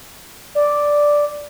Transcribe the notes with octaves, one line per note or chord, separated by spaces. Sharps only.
D5